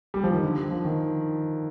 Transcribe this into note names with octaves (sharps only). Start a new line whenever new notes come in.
G3
F3
D#3
D3
F3
D#3